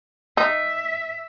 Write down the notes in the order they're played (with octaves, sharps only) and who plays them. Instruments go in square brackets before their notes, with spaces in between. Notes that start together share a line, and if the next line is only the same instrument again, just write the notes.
[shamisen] D#4 [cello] E5